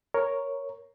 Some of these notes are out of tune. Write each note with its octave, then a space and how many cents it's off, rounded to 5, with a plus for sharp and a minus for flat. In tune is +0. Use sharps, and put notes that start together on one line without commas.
A#4 +0 C#5 +0